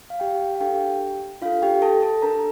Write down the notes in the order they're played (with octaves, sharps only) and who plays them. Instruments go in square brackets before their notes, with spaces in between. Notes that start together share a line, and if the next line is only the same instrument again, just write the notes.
[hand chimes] F5
G4 G5
F5
D4 G4 A4 G5
D4 F4 A4 F5
G4 G5
A4 A5
A4 A5
D4 A4 A#4 A#5